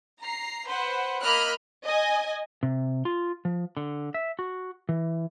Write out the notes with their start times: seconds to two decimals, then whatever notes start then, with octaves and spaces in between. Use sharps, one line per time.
0.20 A#5 C7
0.67 B4 C5 F#5
1.22 A#3 D#5 B5 F6 F#6
1.86 D#5 G#5
2.63 C3
3.05 F4
3.45 F3
3.77 D3
4.14 E5
4.39 F#4
4.89 E3